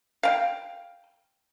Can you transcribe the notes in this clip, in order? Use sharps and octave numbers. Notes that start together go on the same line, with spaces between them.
F5 G5